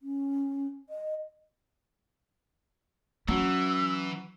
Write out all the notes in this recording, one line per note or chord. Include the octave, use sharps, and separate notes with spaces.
C#4
D#5
E3 F#3 C#4 E6